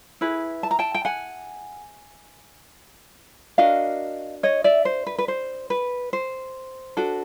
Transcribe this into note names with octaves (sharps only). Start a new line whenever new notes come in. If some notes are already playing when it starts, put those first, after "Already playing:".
E4 G#4 B4
A5
A#5
G5 A5
G5
F#5 G#5
D4 F#4 A#4 D#5 F5
C#5 D#5
D5 E5
C5
B4
B4
C5
B4
C5
D4 F#4 A4